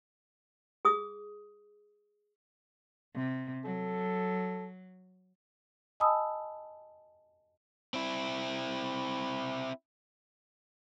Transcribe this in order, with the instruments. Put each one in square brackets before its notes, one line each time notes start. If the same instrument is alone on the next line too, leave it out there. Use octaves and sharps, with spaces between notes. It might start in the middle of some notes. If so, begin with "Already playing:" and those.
[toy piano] G#4 D#6
[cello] C3
[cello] F#3 [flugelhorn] A4
[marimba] D#5 G#5 A5 B5 D#6 E6
[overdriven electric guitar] C4 E4